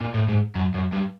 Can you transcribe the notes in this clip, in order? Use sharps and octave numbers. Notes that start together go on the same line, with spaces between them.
A#2
A2
G#2
F#2
F#2
G2